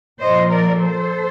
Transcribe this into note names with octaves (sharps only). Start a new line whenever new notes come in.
A#2 F3 C5 D#5
A#4 D5
A4 C5